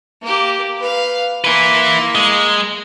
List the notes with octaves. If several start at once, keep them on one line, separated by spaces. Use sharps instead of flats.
A#3 G4
B4 F5
A#3 E4 B4 C6
G#3